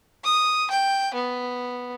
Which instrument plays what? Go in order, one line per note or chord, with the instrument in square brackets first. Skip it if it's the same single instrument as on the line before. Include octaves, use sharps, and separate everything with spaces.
[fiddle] D#6
G5
B3